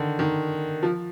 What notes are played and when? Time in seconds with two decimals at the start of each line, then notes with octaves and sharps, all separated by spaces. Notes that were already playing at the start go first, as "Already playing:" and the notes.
Already playing: D3 D#3
0.19 D#3
0.83 F3